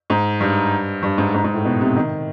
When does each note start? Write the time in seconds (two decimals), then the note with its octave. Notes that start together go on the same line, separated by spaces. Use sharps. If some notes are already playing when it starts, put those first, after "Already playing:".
0.10 G#2
0.40 G2
1.03 G2
1.18 G#2
1.34 G#2
1.44 G#2
1.54 A2
1.65 B2
1.81 C3
1.96 D#3